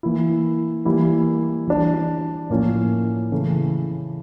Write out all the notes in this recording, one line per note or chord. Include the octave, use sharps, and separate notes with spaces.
E3 A#3 E4
E3 G3 A#3 E4
E3 G3 D4 G4
A2 F3 A#3 C#4
C#3 E3 A3